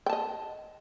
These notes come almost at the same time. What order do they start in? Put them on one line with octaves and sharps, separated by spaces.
G5 A5 D#5